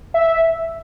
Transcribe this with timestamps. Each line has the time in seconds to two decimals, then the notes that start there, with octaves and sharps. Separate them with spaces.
0.14 E5